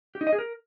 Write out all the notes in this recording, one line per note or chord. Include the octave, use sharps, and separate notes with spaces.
G4
D#4
D#5
G#4
A#4